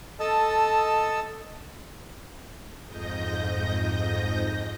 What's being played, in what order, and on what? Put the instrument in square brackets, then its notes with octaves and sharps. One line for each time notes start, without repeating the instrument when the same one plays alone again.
[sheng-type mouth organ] A4 D#5 A5 E6
[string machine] F2 G#2 D#5 G6 A#6